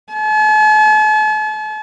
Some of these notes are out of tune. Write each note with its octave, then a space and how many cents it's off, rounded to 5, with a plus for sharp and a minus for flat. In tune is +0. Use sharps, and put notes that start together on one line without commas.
A5 -45